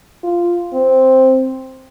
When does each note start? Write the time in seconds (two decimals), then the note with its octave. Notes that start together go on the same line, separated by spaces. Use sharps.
0.23 F4
0.73 C4